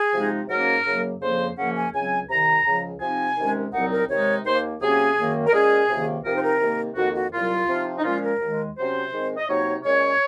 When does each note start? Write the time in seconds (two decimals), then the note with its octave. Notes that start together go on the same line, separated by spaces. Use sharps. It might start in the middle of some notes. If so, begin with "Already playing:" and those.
Already playing: G#4
0.13 C3 F3 G#3 D#4
0.49 G#2 F#3 A#3 C#4 A#4
0.85 F#2 C#3 F#3 A#3
1.21 F2 C#3 F3 A#3 C5
1.57 F#2 C#3 F3 A#3 C#4 F#5
1.75 G#5
1.93 C#2 C#3 F#3 C4 G#5
2.29 C2 C3 D#3 A#5
2.65 C#2 C#3 F3
3.01 C3 F3 C4 D#4 G#5
3.37 C2 C3 D#3 G#3 C#4
3.73 C2 A#2 F#3 C4 D#4 F#5
3.91 A#4
4.09 C3 D#3 G#3 D#4 C#5
4.45 D#2 D#3 A#3 C5
4.81 C3 F#3 A#3 C#4 G#4
5.17 F#2 D#3 A#3
5.47 A#4
5.52 A#2 G#3 C#4 G#4
5.88 C#2 C3 D#3 A#3
6.24 C3 F3 C4 D#4 A#4
6.35 C5
6.42 A#4
6.60 C3 D#3 A#3
6.96 F2 D#3 A#3 F#4
7.14 F#4
7.32 C2 A#2 F#3 F4
7.68 C3 F3 C4 D#4
7.98 D#4
8.04 A#2 F3 G#3 C#4 F4
8.22 A#4
8.40 D#2 D#3 G#3
8.76 C3 F#3 C#4 C5
9.12 G#2 D#3 G#3 C4
9.37 D#5
9.48 C3 F#3 A#3 D#4 C#5
9.84 A#2 G#3 C#4 C#5